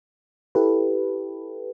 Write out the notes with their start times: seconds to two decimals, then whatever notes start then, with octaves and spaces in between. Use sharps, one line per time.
0.55 E4 G4 A4 B4